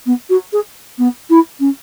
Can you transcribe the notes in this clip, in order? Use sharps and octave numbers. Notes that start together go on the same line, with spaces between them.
B3
F#4
G#4
B3
E4
C#4